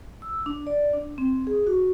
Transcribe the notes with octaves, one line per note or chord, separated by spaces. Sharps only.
E6
D4
D5
D4
C4
G#4
F#4